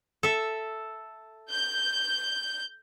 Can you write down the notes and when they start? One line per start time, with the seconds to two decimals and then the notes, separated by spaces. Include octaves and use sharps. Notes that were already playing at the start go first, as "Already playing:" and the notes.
0.23 A4 E5
1.50 G6